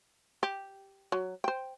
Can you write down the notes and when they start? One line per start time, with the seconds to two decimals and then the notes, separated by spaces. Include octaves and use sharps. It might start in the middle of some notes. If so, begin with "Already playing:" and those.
0.43 G4
1.12 F#3
1.44 C5 G5